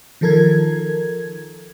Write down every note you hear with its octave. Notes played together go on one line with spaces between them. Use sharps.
D#3 F3 A4 A#4 G#6